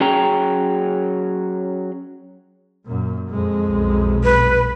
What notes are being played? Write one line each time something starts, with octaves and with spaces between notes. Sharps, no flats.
F#3 C#4 G#4 G5 A#5
F#2 A#2
F2 G#3
B1
B4